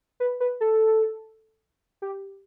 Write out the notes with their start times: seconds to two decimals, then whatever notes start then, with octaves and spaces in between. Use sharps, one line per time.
0.20 B4
0.40 B4
0.61 A4
2.02 G4